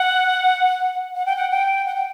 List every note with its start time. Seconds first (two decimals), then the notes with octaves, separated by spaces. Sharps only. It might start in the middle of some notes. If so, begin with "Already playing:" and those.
Already playing: F#5
1.15 F#5
1.26 G5
1.36 F#5
1.51 G5
1.86 F#5
1.95 G5